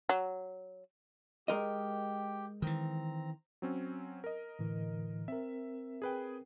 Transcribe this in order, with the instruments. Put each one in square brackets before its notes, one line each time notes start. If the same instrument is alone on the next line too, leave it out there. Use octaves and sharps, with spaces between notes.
[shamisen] F#3
[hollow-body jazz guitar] G#3 A#4 D#5 [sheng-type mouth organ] G4 G5
[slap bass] D#3 E3 [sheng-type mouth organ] C4 A#5
[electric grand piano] F#3 C4 C#4
A#4 D#5
[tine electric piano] A2 D3 E3
[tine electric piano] C4 A#4 [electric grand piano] E5
[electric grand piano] G#4 B4 G5